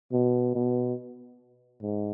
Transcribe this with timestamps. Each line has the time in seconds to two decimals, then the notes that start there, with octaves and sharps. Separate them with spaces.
0.12 B2
0.55 B2
1.82 G#2